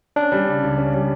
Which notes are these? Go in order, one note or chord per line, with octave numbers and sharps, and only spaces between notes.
C#4 D4
G3
C#3
C#2
C#4
G3